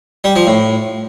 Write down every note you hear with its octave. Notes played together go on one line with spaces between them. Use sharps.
G3
F3
A2